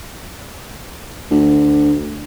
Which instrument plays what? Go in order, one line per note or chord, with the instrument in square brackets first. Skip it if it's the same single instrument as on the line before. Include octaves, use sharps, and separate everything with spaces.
[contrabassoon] D2